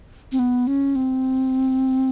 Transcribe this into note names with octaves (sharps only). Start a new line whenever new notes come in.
C4
B3
C#4
C4